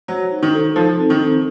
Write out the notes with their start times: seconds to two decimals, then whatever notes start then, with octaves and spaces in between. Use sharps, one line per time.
0.08 F#3 C5
0.31 D#4
0.42 D#3
0.53 A4
0.76 F3 D#4
0.98 C4
1.10 D#3
1.20 C4